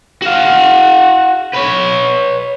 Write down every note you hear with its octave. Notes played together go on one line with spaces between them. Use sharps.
F#4 F5
B4 C#5